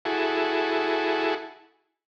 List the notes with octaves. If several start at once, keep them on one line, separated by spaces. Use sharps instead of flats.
E4 F#4 G#4 A4